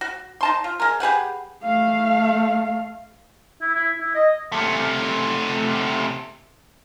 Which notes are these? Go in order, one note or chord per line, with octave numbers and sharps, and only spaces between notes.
F#4
D#4 A5 C6
F4
G#3 A#4
G4 G#4 B4 F#5
A3 F5
E4
E4
E4
D#5
C3 A3